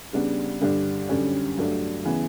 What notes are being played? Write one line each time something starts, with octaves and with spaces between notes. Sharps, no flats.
C#3 G3 B3 D4
G2 D3 G3 D4
F#2 D3 G3 C#4
G2 F#3 A3 D4
C#3 E3 B3